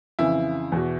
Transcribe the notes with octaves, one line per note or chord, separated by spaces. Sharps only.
F2 C#3 E3 E4
E2 B2